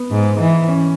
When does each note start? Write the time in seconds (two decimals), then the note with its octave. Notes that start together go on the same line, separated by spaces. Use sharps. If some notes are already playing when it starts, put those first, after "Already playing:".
Already playing: B3
0.11 G#2
0.40 E3
0.68 C#4